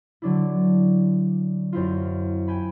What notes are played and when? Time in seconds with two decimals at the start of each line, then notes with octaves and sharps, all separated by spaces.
0.22 D3 F#3 D4 E4
1.73 F#2 C4 E4 F4
2.48 G5 G#5 B5